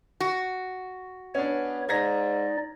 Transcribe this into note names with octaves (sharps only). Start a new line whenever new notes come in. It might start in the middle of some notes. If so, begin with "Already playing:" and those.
F#4
B3 C#4 D4 C#5
G#2 D#4 D5 G#6 A#6